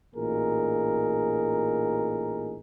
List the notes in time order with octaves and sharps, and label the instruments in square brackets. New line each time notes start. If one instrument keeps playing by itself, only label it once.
[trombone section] A1 A#2 D#4 G#4 A#4